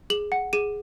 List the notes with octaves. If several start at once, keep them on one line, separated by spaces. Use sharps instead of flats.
G#4 F#7
F#5
G#4 D#7